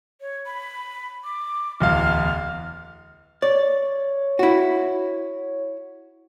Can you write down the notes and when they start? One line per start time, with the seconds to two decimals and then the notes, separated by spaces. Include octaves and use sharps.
0.21 C#5
0.46 B5
1.24 D6
1.80 D1 E2 F5 F6
3.42 C#5 D5
4.39 E4 F#4